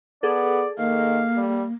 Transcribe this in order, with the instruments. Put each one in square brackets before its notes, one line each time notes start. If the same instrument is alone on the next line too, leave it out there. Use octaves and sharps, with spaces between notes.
[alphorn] B3 [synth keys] G#4 A4 [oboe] D5
[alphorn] D#3 [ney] A#3 [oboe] F5
[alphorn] G3